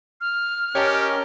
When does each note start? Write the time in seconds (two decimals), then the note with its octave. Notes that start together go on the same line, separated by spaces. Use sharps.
0.21 F6
0.75 C#4 G4 A#4 C#5 D#5 A5